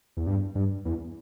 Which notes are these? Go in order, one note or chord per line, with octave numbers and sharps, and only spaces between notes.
E2
G2
G2
E2